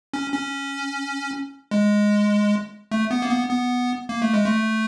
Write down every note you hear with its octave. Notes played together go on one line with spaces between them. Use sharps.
C#4
C#4
G#3
A3
B3
A#3
B3
B3
A#3
A3
G#3
A3